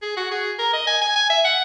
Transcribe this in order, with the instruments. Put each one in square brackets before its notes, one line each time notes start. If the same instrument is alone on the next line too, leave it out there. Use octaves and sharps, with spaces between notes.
[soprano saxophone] G#4
F#4
G#4
A#4
D#5
G#5
G#5
G#5
E5
F#5